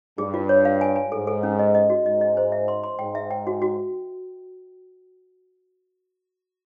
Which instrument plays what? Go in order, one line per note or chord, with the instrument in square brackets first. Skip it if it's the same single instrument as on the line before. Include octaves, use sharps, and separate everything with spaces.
[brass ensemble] G2 [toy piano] G#4
[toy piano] F4
C#5
F5
G#5
G#5
[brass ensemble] G#2 [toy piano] A4
[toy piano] A4
C#4
D#5
D#5
F#4
[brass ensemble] G#2 [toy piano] D#5
[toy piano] D#5
C5
E5
C6
C6
[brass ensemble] G#2 [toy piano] G5
[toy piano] E5
G5
F#4
F#4